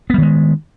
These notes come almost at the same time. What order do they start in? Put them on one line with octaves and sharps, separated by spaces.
B3 G3 D#3 G#3